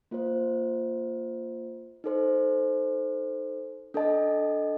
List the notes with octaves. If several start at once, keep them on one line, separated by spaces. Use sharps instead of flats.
A#3 F4 C5
D#4 A4 C5
D4 A4 D#5 A5